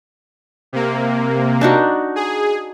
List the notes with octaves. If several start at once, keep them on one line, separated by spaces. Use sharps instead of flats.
C3 A#3
D4 D#4 F#4
G#4